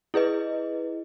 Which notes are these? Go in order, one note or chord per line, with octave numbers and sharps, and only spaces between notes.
E4 G#4 B4 D#5